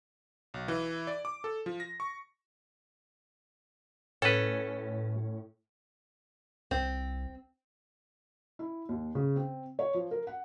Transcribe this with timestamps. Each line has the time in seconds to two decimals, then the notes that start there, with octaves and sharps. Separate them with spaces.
0.54 B1
0.68 E3
1.07 D5
1.25 D6
1.44 A4
1.66 F3
1.80 A#6
2.00 C#6
4.22 A2 C#4 A4 B4
6.71 C2 C4
8.59 E4
8.89 D#2
9.15 C#3
9.36 C4
9.79 C#5
9.94 F3
10.11 A#4
10.27 F#5